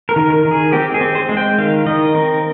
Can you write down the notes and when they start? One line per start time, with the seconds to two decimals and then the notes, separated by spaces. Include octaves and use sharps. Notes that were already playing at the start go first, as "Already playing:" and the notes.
0.09 A#4
0.16 D#3
0.30 A#4
0.45 D#3
0.51 G#4
0.73 C4 G4
0.94 G#4
1.01 C4
1.15 C5
1.29 G#3
1.37 G5
1.58 D#3 F5
1.86 D#3 D#5
2.15 C4 A#4